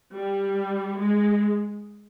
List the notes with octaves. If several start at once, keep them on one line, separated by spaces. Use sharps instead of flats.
G3
G#3